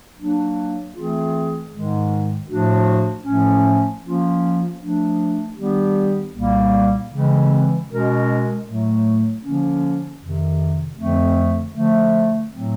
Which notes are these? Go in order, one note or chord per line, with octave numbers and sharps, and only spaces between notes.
F#3 A#3 D4
E3 A3 C4 F4 G#4
G#2 D#3 G#3
A2 F3 A3 D4 F#4
A2 F3 A3 C#4
F3 A#3 C#4 F4
F3 A3 D4
D#3 G3 B3 D4 G4
C2 A#2 G3 A#3
C#3 E3 G#3 C4
B2 G#3 C#4 F#4 A#4
A2 F#3 A3
D3 F3 A#3 C#4
F2 C3 D#3
F2 D3 F3 A3 C4
D3 F3 A3
A2 F#3 A3 C4